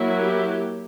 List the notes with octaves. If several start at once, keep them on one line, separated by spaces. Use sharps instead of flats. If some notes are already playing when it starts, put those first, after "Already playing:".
Already playing: F#3 A#3 E4
G4